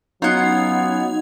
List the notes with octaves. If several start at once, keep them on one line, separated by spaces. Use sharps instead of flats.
F#3 B3 C#4 D#4 F4 F#5 G#6